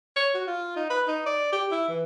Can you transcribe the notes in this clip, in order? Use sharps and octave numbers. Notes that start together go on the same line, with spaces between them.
C#5
F#4
F4
D#4
B4
D#4
D5
G4
E4
E3